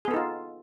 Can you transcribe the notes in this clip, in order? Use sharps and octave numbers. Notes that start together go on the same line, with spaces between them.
B3 D#4 F4 G#4 A4